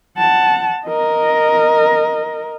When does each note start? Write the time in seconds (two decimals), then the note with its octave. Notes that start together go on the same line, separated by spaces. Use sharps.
0.18 F#5 A5
0.86 A#4 D#5